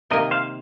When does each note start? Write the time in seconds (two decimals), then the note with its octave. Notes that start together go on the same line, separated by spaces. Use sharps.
0.10 C3 D#3 A#3 A#4 D#5
0.31 C5 F5